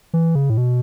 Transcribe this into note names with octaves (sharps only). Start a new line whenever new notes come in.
E3
C#3
A2
B2